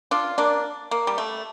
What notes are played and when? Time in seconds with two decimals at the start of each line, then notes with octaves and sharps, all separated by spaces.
0.11 D4 F4
0.38 A#3 D4
0.91 A#3
1.07 G3
1.18 A3